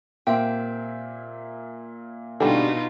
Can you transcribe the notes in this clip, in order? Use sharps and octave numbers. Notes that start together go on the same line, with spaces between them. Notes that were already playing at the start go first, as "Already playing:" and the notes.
A#2 A#3 C4 G4 E5
B2 D3 E3 G3 A3 D#4 F4